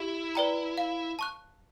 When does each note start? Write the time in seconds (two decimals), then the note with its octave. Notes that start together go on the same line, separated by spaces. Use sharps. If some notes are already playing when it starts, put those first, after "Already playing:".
Already playing: E4 G4
0.35 B4 D5 G5 A#5
0.78 F5
1.19 A5 C#6 F#6